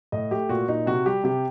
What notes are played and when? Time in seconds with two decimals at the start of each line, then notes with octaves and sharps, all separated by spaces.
0.12 A2 D#5
0.31 A3 G4
0.49 A#2 F#4
0.68 A#2 D#4
0.86 C3 F#4
1.06 G3 G4
1.24 C3 G4